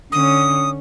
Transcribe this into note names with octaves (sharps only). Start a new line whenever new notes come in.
D3 C#4 D#6